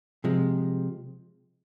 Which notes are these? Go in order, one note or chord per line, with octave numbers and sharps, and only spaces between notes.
C3 F3 G#3